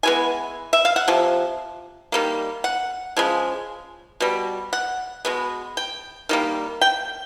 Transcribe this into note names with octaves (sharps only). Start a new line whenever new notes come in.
E3 G#3 B3 G#5
E5
F5
F#5
C3 F3
D#3 G3 A#3
F#5
C#3 F3 G#3
B2 G3
F#5
B2 G#3 B3
G5
D#3 G3 A#3
G5